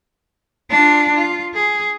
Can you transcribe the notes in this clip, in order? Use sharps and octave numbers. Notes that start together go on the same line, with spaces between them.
D4 F4
F4
G#4